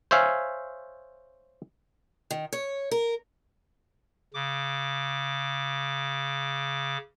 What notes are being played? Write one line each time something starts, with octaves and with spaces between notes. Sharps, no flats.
C5 C#5 E5 F5 G#5
D#3
C#5
A#4
C#3 D6